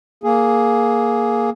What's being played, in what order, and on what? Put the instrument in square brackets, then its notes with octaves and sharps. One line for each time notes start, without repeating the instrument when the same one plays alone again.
[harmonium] A#3 G#4